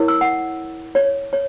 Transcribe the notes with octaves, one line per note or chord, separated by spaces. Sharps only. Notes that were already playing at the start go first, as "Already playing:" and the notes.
Already playing: E4 A#4 C#5
E6
F#5
C#5
C#5